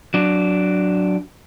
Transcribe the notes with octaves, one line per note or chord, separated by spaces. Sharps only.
F#3 D4